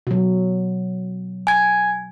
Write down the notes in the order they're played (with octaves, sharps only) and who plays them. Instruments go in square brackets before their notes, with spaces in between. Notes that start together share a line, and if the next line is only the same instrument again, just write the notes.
[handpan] B2 F#3
[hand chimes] G#5 G#6